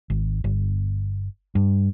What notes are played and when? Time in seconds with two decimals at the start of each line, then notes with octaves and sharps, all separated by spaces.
0.10 G#1
0.44 G1
1.55 G2